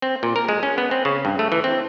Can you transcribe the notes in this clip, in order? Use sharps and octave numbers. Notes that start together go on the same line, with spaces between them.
C4
A#2
A#4
G#3
C#4
B3
C4
C#3
G2
A3
E3
C4